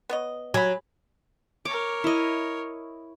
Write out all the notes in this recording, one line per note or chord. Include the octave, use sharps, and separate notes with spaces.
B3 C#5 D#5
F#3 G#5 B5
A#4 C#5 D6
E4 D#5